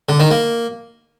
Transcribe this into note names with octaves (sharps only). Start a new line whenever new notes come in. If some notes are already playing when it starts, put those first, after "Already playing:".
D3
D#3
A#3